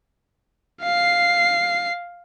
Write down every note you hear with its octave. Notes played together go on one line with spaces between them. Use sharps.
F5 C7